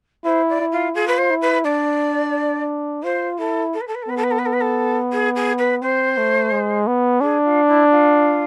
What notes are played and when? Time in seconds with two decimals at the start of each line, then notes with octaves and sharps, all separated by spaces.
0.25 E4 C5
0.49 D5
0.60 E4
0.72 F4
0.95 F4 G#4
1.07 B4
1.18 C5
1.30 E4
1.42 B4
1.65 D4 D5
3.03 F4 C5
3.39 E4 A4
3.74 A4
3.81 B4
3.87 A4
3.95 B4
4.03 A4
4.08 B3 B4
4.17 A4
4.24 B4
4.31 A4
4.39 B4
4.46 A4
4.53 B4
4.61 A4
5.13 G#4
5.36 G#4
5.59 B4
5.82 C4 C5
6.18 A3
6.52 G#3
6.87 B3
7.21 D4 G#4
7.44 F4
7.68 E4
7.91 F4